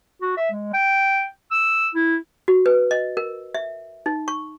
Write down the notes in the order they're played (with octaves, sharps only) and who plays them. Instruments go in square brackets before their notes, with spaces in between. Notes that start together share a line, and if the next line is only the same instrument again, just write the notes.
[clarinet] F#4
E5
G#3
G5
E6
E4
[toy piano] F#4
B4
D#5
A#4
E5
D#4
C#6